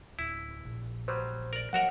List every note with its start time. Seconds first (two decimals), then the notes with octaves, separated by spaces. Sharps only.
0.19 D1 E4
0.65 A#1
1.08 F#3 G3 C5
1.53 A#4 D5
1.73 D#2 F3 F#3 F#4 A#4 F#5